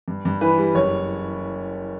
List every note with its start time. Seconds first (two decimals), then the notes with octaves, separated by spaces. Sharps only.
0.08 G2
0.25 G2
0.41 E3 B4
0.58 G3
0.75 F#1 C#5